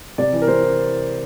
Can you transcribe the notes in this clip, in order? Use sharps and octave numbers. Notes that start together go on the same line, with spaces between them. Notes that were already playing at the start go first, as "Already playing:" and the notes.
C3 D5
E3
A#4
C3 C5
E3